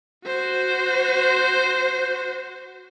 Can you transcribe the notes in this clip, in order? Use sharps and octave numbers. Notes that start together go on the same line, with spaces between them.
F#4 C5